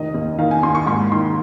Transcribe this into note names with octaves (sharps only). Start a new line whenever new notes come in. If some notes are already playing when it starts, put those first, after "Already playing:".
Already playing: F1 D#3 D#5
D#2
D#3 F5
G#5
D#2 C6
C#6
G#2 C6
D#3 C6